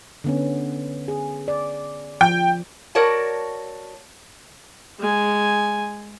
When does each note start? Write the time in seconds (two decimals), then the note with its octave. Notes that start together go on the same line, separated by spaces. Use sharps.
0.24 D3 B3 C#4
1.08 G#4
1.48 D5
2.21 F3 G5
2.95 F#4 A#4 C#5 D5 A5
4.99 G#3 G#5